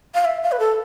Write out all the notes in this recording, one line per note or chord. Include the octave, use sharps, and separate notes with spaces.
F5
E5
F5
B4
A4